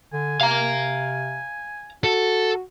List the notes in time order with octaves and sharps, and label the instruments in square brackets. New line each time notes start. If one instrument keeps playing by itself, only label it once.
[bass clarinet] D3 [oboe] G#5
[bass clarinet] C3 [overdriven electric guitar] F5 A#5
[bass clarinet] F#4 [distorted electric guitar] A4